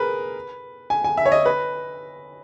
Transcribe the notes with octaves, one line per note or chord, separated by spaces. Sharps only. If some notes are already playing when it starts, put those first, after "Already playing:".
Already playing: G#4 A#4 B4
G#5
G#5
E5
C#5
D#5
B4